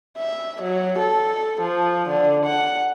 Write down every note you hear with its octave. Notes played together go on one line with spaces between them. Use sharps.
E5
F#3
A4
F3
D3
F#5